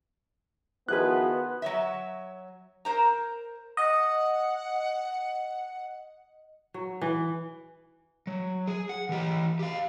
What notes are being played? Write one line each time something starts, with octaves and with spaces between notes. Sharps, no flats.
D#3 F3 B3 E4 F#4 G#4 B4 F#6
F#3 C#5 E5
A#4 C5 A#5
D#5 F#5
F#3
E3
F#3
G#4
F#5
E3 G4
G4 F5